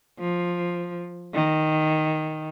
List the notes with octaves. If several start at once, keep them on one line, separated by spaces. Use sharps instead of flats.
F3
D#3